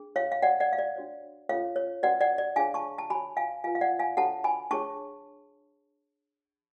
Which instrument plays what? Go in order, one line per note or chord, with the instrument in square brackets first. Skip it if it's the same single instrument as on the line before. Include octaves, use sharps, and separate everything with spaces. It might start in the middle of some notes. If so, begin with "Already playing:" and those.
Already playing: [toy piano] D4 G#4
C#5 F5
F5
F#4 C#5 D5 F#5
D5 F#5
F5
D5
D4 F#4 C#5
C#4 F4 A4 C#5 F5
C#5
C#4 F#4 B4 D5 F#5
D5 F#5
D5
D4 G#4 C#5 F5 G#5
A5 C#6
A5
F#4 C#5 G#5 B5
F5 G#5
F4 F5 G#5
B4
F5
D5 F#5
F5 G#5
D4 F#4 A4 C#5 F#5 A5
G#5 B5
D4 G#4 C#5 A5 C#6